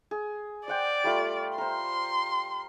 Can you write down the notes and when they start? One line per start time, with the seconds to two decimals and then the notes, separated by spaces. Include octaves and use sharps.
0.11 G#4
0.68 C5 D5 F#5 G5
1.04 G3 A3 F4
1.58 A#4 C5 C6